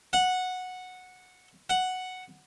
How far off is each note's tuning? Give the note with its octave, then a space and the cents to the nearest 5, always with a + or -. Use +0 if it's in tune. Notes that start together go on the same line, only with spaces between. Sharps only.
F#5 -10
F#5 +0